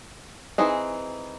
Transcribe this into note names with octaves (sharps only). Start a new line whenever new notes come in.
E3 C4 D#4 G#4